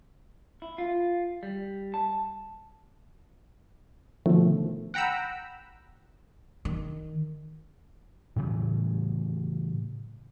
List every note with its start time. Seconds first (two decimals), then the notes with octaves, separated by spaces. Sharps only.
0.62 E4
0.78 F4
1.43 G3
1.94 A5
4.26 B2 D3 D#3 F3 A3
4.94 F#5 G5 A#5 B5 E6
6.65 D#3
8.36 A2 C#3 E3 F#3